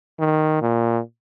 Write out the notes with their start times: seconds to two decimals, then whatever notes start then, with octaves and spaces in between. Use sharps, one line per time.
0.20 D#3
0.62 A#2